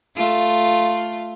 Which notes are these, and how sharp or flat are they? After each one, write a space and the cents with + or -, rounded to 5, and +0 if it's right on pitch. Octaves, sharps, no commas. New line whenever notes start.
A3 +0 F4 +0